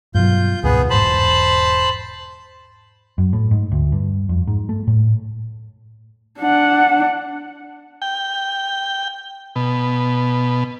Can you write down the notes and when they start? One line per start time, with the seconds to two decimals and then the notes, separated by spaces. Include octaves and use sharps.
0.15 G2 B2 F#3 F4 G6
0.64 C#2 G#2 B2 B3 G#4
0.90 E1 G#2 C5 A5 B5
3.18 F#2
3.33 A2
3.51 G#2
3.72 D2
3.92 G2
4.29 F2
4.47 G#2
4.69 A3
4.87 A2
6.40 D4 F#5
8.02 G5
9.56 B2